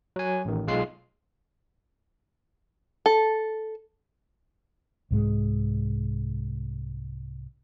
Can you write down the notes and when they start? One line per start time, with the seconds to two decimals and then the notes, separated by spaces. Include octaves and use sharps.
0.16 F#3 G#5
0.45 A1 D#3
0.67 B1 G#3 F4 C7
3.06 A4
5.11 C2 G#2 G#3